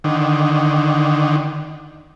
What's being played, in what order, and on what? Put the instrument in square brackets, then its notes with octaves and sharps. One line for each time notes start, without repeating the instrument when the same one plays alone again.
[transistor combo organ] D3 D#3